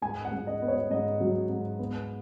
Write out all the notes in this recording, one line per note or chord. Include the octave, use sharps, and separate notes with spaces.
G#2 G#5
F#5
G#2
D#5
B3
C#5
G#2 D#5
F#3
G#2
B3